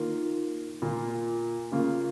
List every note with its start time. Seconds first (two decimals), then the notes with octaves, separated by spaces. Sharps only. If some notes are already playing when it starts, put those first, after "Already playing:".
Already playing: D#3 A#3 F4 A#4
0.82 A#2 A#3 F4
1.72 C#3 A#3 F4